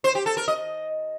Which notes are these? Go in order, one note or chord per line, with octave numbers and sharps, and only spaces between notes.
C5
G4
A4
A#4
D#5